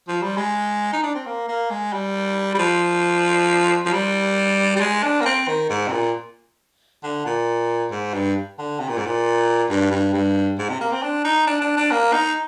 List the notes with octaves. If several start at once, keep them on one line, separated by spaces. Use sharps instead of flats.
F3
G3
G#3
D#4
D4
C4
A#3
A#3
G#3
G3
G3
F3
F3
G3
G3
G#3
D4
A#3
C4
D#3
G#2
C3
A#2
D3
A#2
G#2
G2
D3
C3
A#2
G#2
A#2
G2
G2
G2
G#2
C3
A#3
C4
D4
D#4
D4
D4
D4
A#3
D#4